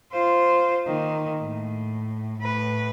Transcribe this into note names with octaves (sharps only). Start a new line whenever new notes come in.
F4 C5
D#3 A#3
A2
A2 B4